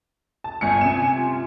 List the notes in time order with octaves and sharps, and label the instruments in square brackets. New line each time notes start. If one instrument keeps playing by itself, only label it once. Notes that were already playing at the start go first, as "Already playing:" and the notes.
[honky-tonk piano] A5
[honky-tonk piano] G1 C#7 [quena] G#5
[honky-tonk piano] C3 E7
[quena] F4